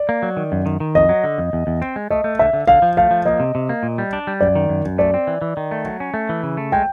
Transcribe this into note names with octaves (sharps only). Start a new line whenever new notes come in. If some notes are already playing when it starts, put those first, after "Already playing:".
Already playing: D5
A#3
F#3
D#3
F#2
D#3
D#3
F2 D#5
F#3
D3
F2
E2
E2
C4
G#3
A3 D#5
A3
D3 E5
D3
D3 F5
F3
A3 F5
F3
A#3 D#5
C3
C3
A#3
A#2
G3
D4
G3
F#2 D5
D#3
F#2
F#2
A3 D5
C4
E3
E3
D#3
A3
F#3
C#4
A3
E3
C#3
A3
G#3 G5